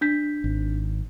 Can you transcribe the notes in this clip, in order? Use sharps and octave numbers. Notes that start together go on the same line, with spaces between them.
D4 G6 B6
G#1